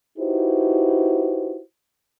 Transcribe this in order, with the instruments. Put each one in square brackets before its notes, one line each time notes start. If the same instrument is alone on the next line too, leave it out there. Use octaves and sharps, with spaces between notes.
[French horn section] D#4 E4 F#4 G4 B4 C5